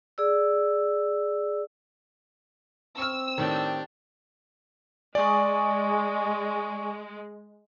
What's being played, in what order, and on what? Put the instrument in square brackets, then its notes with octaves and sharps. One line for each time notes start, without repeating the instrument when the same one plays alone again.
[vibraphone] G#4 D5 E6
[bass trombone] C4 [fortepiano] C#6 F6 [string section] E6
[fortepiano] A2 D#3 [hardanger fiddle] D4 G4
[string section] G#3 [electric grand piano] D5 [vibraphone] G#5 C#6 D#6